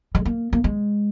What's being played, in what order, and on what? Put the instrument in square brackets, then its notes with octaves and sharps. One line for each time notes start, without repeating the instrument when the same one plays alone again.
[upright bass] G#3
A#3
A#3
G#3